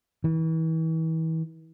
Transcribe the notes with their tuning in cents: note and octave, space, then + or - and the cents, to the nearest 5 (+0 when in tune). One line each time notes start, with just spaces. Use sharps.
E3 -35